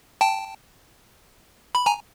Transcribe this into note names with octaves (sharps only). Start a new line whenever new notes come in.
G5 A5
B5
G#5 A#5